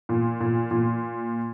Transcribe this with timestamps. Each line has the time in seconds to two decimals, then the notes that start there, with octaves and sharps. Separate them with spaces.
0.09 A#2
0.40 A#2
0.71 A#2